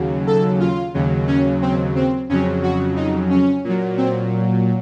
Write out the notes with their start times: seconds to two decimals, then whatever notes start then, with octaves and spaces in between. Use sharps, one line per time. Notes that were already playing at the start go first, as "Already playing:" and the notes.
Already playing: D#2 C#3 F#3
0.27 A4
0.60 F4
0.94 D#2 C#3 F#3
1.27 C#4
1.62 C4
1.96 C4
2.29 F2 C#3 F#3 C#4
2.63 F#4
2.96 D#4
3.30 C#4
3.64 A#2 F#3
3.97 C4